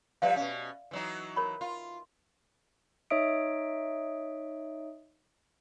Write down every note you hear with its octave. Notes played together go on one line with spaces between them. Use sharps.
F3 G3 B4 D5 E5 F5
B2 C#4
E3 F#3 D#4
A#4 C#5 B5
F4
D#4 C#5 D#5 E5 D#6 D7